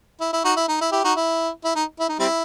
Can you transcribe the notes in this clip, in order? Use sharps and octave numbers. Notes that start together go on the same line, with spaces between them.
E4
E4
D#4 F#4
E4
D#4
E4
E4 G4
D#4 F#4
E4
E4
D#4
E4
D#4
G3 C4 E4